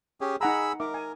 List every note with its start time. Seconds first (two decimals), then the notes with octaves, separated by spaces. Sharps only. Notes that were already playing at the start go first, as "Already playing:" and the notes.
0.21 C#4 G4 G#4
0.41 D#4 G#4 F#5 A#5 B5 E6
0.80 D#4 A#4 E5 D6
0.94 G#5